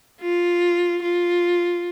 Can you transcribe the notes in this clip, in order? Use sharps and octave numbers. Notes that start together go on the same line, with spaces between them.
F4
F4